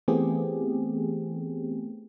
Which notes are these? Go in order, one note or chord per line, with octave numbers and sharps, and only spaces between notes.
E3 A3 B3 C4 G4 G#4